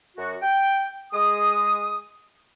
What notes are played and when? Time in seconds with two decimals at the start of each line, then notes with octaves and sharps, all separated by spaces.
0.18 F#2 F#4
0.41 G5
1.13 G#3 D#6